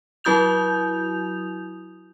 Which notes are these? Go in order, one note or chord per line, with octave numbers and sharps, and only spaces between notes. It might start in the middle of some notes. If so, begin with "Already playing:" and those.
F#3 E4 F#4 D#6 G6 F7